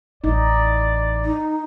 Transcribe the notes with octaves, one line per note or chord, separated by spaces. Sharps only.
A1 D#4 D5
D#4